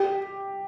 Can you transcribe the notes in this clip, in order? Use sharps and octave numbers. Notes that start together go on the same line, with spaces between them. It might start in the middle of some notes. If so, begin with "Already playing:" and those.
Already playing: G4